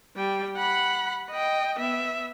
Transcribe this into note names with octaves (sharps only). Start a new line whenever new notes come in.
G3 G5
F#5 B5
D#5 G5
B3 E5